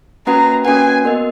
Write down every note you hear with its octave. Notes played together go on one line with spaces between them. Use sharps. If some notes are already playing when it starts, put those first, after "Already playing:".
A#3 C#4 F#4 B4 F#5 A#5
A#3 C#4 F#4 B4 F#5 G#5
B3 F#4 A#4 D#5 F#5